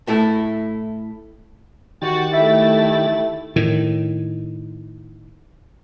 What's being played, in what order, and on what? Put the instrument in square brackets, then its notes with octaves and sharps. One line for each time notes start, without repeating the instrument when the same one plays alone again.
[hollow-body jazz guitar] A2 A3 E4 A4
[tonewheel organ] D#3 G4 A6 [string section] F#4
[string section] A3 E4 [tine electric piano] E5
[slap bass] A2 D#3